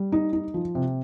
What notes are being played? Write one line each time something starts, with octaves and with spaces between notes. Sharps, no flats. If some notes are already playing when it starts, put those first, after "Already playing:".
Already playing: G3
D#4
D#4
F3
C3